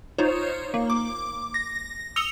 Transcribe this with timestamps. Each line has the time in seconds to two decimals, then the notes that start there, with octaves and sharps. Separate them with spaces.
0.18 D#4 F4 C5 C#5
0.74 A#3
0.90 D6
1.54 A#6
2.16 D#6 E6 C#7 F7 G7